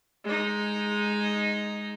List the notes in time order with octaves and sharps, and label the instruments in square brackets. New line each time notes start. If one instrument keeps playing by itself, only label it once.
[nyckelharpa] G#3 D#4